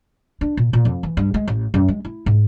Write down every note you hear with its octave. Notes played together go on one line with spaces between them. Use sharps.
D4
A#2
A#2
F2
E3
G2
G#3
A1
F#2
G#3
E4
G#2